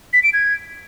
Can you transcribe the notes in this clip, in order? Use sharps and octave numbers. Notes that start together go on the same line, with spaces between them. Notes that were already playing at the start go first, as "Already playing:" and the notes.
B6
D7
G#6